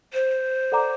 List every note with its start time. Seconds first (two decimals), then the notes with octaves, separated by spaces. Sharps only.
0.13 C5
0.72 A4 D5 F#5 A#5 D6